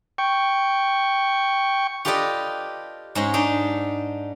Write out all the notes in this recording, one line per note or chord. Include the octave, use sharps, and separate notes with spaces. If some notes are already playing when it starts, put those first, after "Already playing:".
G5 C#6
F4 G4 A4 B4 D5 D#5
G#2 G#3 C#4
D4 D#4